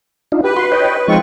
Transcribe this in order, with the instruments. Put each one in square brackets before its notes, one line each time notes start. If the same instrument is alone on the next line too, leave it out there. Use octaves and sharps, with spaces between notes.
[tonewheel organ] D4 D#4 F4
[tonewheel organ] G4 [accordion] B4
[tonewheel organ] F#4 C6
C#5 D#5 G5
[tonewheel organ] F3 G#3 D#4 [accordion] C4 F4 C#6